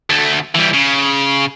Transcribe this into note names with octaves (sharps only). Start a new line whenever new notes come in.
D2 A3
E3 G3
C#3